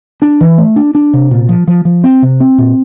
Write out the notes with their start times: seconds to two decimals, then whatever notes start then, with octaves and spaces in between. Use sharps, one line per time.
0.22 D4
0.41 E3
0.58 A3
0.76 D4
0.95 D4
1.13 C3
1.31 A#2
1.49 F3
1.67 F3
1.85 F3
2.04 C4
2.22 C3
2.40 C4
2.58 A#2